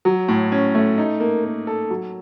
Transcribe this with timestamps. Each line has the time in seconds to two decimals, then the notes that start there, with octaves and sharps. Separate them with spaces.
0.05 F#3
0.28 A2
0.52 C#4
0.75 A3
0.98 D#4
1.20 A#3
1.44 A#3
1.67 A4
1.90 F#3